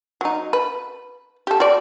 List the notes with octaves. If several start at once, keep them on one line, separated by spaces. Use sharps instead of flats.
F#3 D#4
B4
G4 A4
F#4 D5